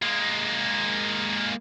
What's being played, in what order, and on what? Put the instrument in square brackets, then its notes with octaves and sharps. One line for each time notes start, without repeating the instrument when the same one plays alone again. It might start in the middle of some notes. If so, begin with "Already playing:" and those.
[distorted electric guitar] G#3 A#3